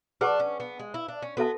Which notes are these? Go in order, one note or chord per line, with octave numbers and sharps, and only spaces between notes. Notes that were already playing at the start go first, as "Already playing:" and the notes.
D4 G#4 B4 F#5 A5 C#6
C#4
B3
G#3
E4
D4
C#4
B3 F#4 A4 E5 A5